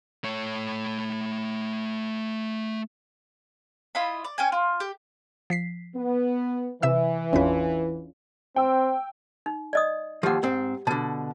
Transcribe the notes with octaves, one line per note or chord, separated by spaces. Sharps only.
A3 C#5
E4 F4 D#5 B5
D5
C#4 G5 G#5
F4
G4
F3 B6 C7
B3
C3 E3 E5 E6
G#1 E2 C#4 D4 F4 B4
C4 G5 E6
D#4
D5 D#5 D#6
D#2 F3 G4 F#5
G#2 C4
B2 D3 A5